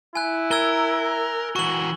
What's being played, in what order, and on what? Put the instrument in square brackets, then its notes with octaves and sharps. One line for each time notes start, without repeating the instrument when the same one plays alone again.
[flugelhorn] E4 [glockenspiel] G#5 F#6
[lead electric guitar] A#4 [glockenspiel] E6 G#6 G7
[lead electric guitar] E3 F#4 [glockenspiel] C#6 F#7